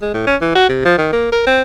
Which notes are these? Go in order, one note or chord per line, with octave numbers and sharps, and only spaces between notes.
G#3
A2
C#4
E3
F#4
C3
F3
D#3
A#3
A#4
C4